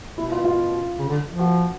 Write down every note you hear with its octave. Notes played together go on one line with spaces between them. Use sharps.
B2 E4
F4
F4
C#3
D3
F3
F#4